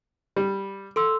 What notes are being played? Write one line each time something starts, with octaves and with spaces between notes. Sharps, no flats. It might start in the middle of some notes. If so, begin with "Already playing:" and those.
G3
A4 C6 E6